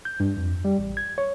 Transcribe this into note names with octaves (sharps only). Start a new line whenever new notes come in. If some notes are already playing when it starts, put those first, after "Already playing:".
G6
G2
F2
G3
A1
G#6
C#5